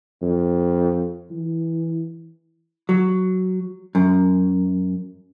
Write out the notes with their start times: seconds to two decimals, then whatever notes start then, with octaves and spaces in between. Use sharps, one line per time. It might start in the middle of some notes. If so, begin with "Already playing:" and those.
0.22 F2
1.31 E3
2.89 F#3
3.95 F#2